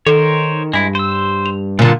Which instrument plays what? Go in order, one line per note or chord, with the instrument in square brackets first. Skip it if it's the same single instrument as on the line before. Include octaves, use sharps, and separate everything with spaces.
[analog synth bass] D#3 [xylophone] A4 [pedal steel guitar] A#4 C5 C#5
[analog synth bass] G2 [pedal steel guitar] G#3 E4
[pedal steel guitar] C5 E6
[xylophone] F7
[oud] A#2 D3 [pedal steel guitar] F4